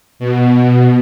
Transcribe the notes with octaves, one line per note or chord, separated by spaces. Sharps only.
B2